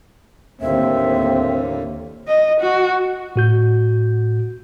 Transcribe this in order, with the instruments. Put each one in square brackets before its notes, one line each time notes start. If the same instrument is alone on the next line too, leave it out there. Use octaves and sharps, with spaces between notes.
[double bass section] D#2 [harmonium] A2 D3 A#3 [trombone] C4 [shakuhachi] E5
[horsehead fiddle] D#5
F#4
[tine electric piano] A2 F#4 G6